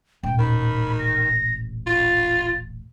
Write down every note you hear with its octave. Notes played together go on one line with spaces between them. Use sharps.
D#1 A1 G5
D#3 B5
A#6
F4 A6